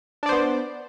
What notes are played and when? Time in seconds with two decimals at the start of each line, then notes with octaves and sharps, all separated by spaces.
0.23 D4
0.26 D5
0.29 C5
0.32 B3